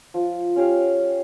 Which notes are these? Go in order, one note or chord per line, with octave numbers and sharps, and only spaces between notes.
F3
C#4 G4 F5